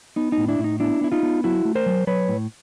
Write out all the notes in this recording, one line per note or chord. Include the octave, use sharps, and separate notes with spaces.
B3 D#4
D#4
A2
D4 E4
A2
D#4
B3 D4 E4
B3 E4
D#4 F4
B3
F#3 E4 F#4
A3
A#4 C5
F#3
F#3 B4 C#5
A2